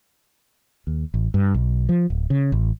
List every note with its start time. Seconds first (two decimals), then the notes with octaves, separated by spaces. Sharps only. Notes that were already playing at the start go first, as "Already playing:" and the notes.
0.87 D#2
1.14 A1
1.34 G2
1.54 B1
1.89 F3
2.10 D1
2.30 C#3
2.52 A1